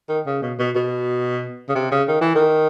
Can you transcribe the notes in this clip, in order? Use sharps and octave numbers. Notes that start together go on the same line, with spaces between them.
D#3
C#3
B2
B2
B2
C#3
C3
C#3
D#3
E3
D#3